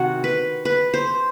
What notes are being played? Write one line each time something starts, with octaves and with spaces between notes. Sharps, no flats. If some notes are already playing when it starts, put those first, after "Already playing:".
Already playing: C3 D#3 F#4
B4
B4
C5